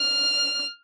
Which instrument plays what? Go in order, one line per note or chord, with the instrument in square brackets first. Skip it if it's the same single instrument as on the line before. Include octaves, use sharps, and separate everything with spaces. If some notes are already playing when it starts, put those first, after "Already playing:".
Already playing: [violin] F6